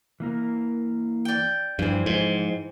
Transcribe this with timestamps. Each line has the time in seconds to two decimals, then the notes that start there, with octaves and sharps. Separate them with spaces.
0.20 E3 A#3 A#4
1.25 D5 G5
1.79 G2 E3 F3 C4 G#5
2.06 G#2